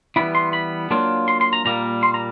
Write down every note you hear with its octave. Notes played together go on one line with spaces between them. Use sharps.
E3 G3 B3 E4 B5
C6
B5
F#3 A#3 D4 F4
C6
C6
A#5
A#2 G3 A#3 A#5
C6
A#5